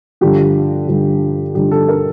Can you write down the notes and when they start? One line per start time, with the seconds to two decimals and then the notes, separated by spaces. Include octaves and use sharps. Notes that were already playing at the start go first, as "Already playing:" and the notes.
0.21 G2 D3 F3 G4
0.88 G2 D3 F3
1.55 G2 D3 F3 G4
1.71 A4
1.88 A#4